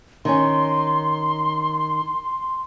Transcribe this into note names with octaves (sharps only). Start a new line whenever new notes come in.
D#3 C#4 C6